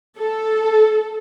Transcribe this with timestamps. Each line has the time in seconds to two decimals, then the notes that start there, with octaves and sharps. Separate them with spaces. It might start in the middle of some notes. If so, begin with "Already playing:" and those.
0.18 A4